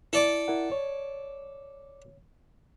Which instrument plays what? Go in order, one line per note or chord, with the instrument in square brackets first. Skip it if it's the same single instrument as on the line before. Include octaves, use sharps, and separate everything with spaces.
[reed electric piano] E4 [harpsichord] A4 D5 D6
[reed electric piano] E4 A#4 F#5
C#5